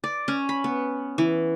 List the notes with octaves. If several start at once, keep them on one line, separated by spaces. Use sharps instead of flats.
D5
C#4
B5
B3
E3